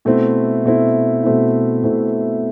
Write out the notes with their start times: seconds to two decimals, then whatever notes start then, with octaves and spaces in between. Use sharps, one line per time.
0.05 B2 A3 C4 E4
0.65 B2 A3 C4 E4
1.24 B2 A3 C4 E4
1.83 B2 A3 C4 E4